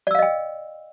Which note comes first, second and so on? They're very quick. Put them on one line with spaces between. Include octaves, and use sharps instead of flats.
D5 E6 F5 D#5 G5